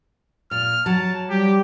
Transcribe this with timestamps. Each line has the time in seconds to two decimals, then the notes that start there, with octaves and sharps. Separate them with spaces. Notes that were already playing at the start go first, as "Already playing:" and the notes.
0.51 A#2 F6
0.86 F#3 A5
1.30 G3 G4